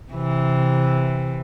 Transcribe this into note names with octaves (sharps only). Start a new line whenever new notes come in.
C3 E3